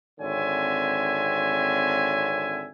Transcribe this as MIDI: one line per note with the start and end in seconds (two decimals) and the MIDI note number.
0.20 2.70 32
0.20 2.70 50
0.20 2.70 60
0.20 2.70 73
0.20 2.70 76
0.20 2.70 80